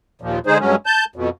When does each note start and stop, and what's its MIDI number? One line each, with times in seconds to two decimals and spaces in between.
0.22 0.39 39
0.22 0.39 46
0.22 0.39 53
0.46 0.58 50
0.46 0.58 56
0.46 0.58 63
0.46 0.58 68
0.46 0.58 72
0.60 0.76 43
0.60 0.76 54
0.60 0.76 56
0.60 0.76 61
0.86 1.05 81
0.86 1.05 91
1.16 1.29 41
1.16 1.29 47